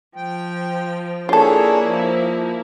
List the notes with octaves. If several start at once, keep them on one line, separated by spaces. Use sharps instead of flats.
F3 G5
A#3 D4 E4 F4 G#4 A4 C#5
F3